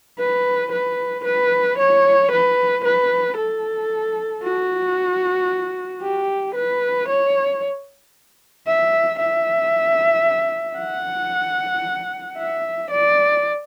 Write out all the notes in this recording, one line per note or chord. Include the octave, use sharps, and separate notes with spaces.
B4
B4
B4
C#5
B4
B4
A4
F#4
G4
B4
C#5
E5
E5
F#5
E5
D5